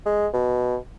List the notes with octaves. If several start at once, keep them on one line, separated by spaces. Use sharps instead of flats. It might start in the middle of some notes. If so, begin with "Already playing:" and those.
G#3
B2